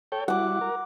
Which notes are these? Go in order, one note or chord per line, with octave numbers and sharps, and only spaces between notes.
A4 C#5 G5
G3 E4 F#4 F#5 D6
A#4